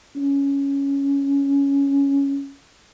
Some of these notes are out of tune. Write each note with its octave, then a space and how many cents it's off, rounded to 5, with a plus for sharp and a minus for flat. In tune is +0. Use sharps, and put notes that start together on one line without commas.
C#4 +5